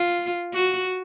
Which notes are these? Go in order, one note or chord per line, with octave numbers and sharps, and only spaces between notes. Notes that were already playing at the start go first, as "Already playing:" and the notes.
Already playing: F4
F#4